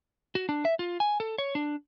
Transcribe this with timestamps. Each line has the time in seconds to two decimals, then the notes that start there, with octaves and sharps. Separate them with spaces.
0.35 F#4
0.49 D4
0.65 E5
0.79 F4
1.00 G#5
1.20 A4
1.38 C#5
1.55 D4